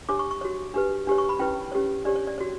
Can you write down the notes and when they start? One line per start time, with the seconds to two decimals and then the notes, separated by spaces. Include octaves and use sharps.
0.09 D4 G4 C#5 D6
0.19 C#6
0.31 C#6
0.41 F#4 C#5
0.74 D4 G4 B4
1.07 D4 G4 C#5
1.18 C#6
1.29 B5
1.39 C#4 E4 B4 G5
1.72 C#4 G4 C#5
2.05 D4 G4 C#5 D5
2.16 C#5
2.27 D5
2.38 F#4 C#5